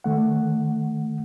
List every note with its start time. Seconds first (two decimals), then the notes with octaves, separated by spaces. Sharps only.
0.04 D#3 A3 F#5